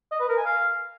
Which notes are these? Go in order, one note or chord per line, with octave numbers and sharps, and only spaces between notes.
D#5
B4
A#4
G#5
F5